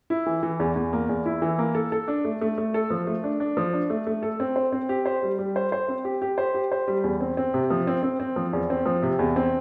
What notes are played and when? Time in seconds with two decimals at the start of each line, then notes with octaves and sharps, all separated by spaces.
0.10 E4
0.26 E3
0.43 E3
0.60 E2
0.76 E2
0.93 A#3
1.09 E2
1.26 E4
1.42 E3
1.59 A#3
1.75 A4
1.92 A4
2.08 D4
2.25 A3
2.41 A3
2.58 A3
2.74 A4
2.90 F3
3.07 A3
3.24 D4
3.40 D4
3.57 F3
3.73 D4
3.90 A3
4.07 A3
4.23 A4
4.40 C4
4.56 C5
4.72 C4
4.89 G4
5.06 C5
5.23 G3
5.39 G3
5.56 C5
5.72 C5
5.88 C4
6.05 G4
6.22 G4
6.38 C5
6.55 G4
6.72 C5
6.88 G3
7.04 E2
7.21 C4
7.37 C4
7.54 C3
7.70 F3
7.87 C4
8.03 C4
8.20 C4
8.36 F3
8.53 E2
8.70 C4
8.86 F3
9.03 C3
9.19 E2
9.36 C4